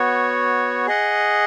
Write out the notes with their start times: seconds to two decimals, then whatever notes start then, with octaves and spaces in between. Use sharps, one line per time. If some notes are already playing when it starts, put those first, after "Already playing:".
Already playing: B3 F#4 C#5
0.86 G#4 D#5 F#5